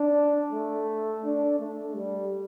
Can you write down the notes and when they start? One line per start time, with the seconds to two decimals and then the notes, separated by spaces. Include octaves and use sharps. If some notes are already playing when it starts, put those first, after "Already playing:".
Already playing: D4
0.52 A3
1.24 D4
1.60 A3
1.95 G3